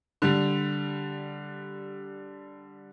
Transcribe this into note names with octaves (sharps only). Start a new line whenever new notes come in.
D3 G3